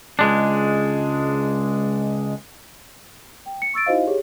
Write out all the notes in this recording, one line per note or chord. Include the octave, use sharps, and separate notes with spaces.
C#2 G#3 D4
G5
C#7
C#6 E6 A6 D7
D#4 E4 F#4 C5 D#5 F5
G4 G#4 C#5